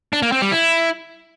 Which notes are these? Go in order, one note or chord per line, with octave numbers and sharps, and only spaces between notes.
D4
A#3
C4
G3
E4